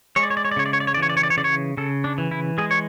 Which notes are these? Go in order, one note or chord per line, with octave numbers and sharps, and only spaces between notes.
G#3 C#5
D5
C#5
D5
C#5
D5
C#3 C#5
D5
C#5
D5
C#5
D5
E3
C#5
D5
C#5
D5
C#5
C#3 D5
C#5
C#3 A4
D4
E3
E4
G#3 G#4
C#5